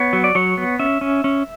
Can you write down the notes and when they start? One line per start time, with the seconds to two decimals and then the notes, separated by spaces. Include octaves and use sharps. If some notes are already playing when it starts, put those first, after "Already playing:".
Already playing: B3 C#5
0.13 F#3
0.24 D5
0.35 F#3 C#5
0.58 B3
0.79 C#4 E5
1.01 C#4
1.24 C#4